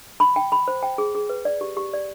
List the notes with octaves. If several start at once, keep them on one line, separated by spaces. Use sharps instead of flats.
B5
G5
B5
C5
G5
G#4
G#4
B4
D5
G4
G4
D5